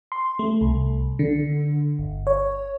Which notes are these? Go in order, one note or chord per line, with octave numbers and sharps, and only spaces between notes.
C6
A3
C2
D3
G1
C#5